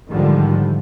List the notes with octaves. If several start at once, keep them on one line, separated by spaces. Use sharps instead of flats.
G#2 D3 D#3 F3 G3